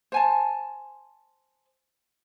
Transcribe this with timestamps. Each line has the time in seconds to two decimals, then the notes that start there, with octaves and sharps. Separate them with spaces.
0.12 C5 G#5 A5